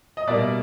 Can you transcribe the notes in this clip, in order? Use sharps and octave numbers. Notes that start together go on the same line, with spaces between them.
D#5
B2 G3 A#3 D5 E5